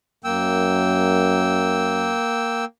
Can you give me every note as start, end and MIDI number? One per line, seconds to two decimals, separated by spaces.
0.24 2.17 42
0.24 2.65 58
0.24 2.65 79
0.24 2.65 88